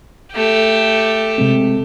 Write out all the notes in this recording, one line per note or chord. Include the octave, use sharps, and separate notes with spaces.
A3 G4
C3 G#3 C4